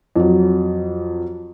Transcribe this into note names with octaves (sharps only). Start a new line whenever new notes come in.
F2 F#3